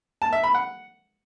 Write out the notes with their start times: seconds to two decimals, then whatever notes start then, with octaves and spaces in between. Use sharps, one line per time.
0.22 A5
0.33 E5
0.44 B5
0.55 F#5